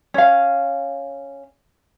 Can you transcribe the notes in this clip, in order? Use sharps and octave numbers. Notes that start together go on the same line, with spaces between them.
C#4 F5